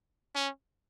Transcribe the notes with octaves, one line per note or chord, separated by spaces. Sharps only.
C#4